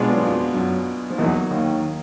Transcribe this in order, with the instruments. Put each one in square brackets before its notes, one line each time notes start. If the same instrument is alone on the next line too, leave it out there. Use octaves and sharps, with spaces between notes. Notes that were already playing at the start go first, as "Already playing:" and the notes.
Already playing: [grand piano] B2 G#3 B3 D4 F4
[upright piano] F#3
F2 F3
F#2 F#3
F3
[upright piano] E2 E3 [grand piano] F#3 A#3 D#4
[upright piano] D#2 D#3